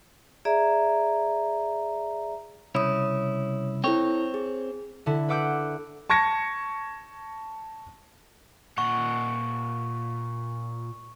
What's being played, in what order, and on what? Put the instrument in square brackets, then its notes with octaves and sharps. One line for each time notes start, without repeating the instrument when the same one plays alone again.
[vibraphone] G#4 D5 E5 A#5
[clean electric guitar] C2 C#3 E4 [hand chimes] C#5 D#6
[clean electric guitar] C4 C#5 [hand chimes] E4 A4 G5
[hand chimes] G#4
[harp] D3 E4
B4 F#5 D6 E6 G6
[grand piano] A5 C#6 G#6 A#6 C#7
[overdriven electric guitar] A#2 F#5 [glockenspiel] C#6